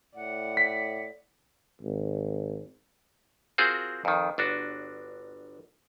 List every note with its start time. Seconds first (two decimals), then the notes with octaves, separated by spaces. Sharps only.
0.15 A2 D5 F#5
0.57 B6
1.82 G#1
3.58 C4 F4 F#4 G#4 A#4 C5
4.05 F2 D#3
4.38 G1 D4 F#4